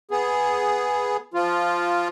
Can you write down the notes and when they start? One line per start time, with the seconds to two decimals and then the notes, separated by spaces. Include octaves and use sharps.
0.11 B3 G#4
1.34 F3 F4